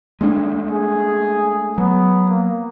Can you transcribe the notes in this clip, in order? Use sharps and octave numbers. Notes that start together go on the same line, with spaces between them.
G#3 A3 D4
G#4
F#3 B3
A#3